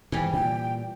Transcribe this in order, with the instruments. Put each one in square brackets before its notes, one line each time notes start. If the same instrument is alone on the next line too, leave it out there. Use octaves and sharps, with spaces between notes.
[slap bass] G#2 [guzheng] E3 G3 G4
[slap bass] A#2 [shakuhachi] G5